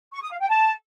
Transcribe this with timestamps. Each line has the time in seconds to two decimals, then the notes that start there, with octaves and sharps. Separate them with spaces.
0.13 C#6
0.22 D#6
0.31 F5
0.40 G5
0.49 A5